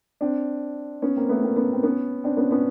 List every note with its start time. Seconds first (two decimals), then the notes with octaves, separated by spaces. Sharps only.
0.21 C4 D4
1.02 B3 C#4
1.17 A#3 C4
1.29 A3 B3
1.43 A#3 C4
1.56 B3 C#4
1.73 C4
1.83 B3 C#4
2.24 C4 D4
2.37 B3 C#4
2.51 B3 C#4